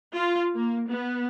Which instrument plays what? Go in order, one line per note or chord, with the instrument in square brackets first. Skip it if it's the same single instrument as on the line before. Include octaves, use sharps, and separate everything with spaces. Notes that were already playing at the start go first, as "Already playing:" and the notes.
[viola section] F4
A#3
B3